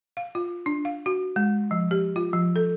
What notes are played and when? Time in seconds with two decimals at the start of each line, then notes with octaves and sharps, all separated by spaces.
0.17 F5
0.35 F4
0.66 D4
0.85 F5
1.06 F#4
1.36 G#3
1.71 F3
1.91 G4
2.16 F4
2.33 F3
2.56 A4